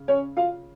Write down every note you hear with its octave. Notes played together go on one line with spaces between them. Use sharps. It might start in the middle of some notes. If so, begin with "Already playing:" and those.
Already playing: C#3
C#4 C#5
F4 F5